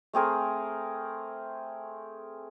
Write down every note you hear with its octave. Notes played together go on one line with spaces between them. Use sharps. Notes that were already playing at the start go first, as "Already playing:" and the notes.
A3 C4 G#4 A#4